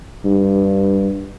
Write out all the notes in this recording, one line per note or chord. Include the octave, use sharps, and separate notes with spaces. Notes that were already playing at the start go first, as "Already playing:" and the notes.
G2